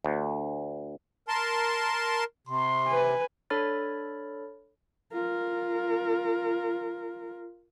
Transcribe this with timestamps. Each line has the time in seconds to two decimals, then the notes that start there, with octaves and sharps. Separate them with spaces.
0.05 D2
1.28 A#4 A5 C6
2.47 C3 C6
2.88 B4 G#5
3.50 D4 A4 C#5 B5 F6 A6
5.12 F4 A#4